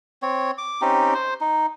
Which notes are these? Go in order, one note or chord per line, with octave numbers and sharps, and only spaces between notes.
C4 C#5
D6
C4 C#4 D#4 G4
C5
D#4